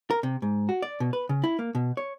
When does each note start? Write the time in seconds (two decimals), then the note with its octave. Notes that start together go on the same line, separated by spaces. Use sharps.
0.11 A#4
0.23 C3
0.42 G#2
0.69 F#4
0.82 D5
1.00 B2
1.13 B4
1.29 C#3
1.44 E4
1.59 A#3
1.75 B2
1.97 C#5